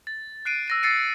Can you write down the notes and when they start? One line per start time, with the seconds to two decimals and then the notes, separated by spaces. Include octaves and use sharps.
0.07 A6
0.45 F#6 C7 D7 D#7
0.68 E6 A#6 D#7
0.83 E6 A6 C7 C#7 D#7